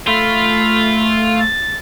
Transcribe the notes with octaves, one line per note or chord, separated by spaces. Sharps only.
A3 F4 B5
A6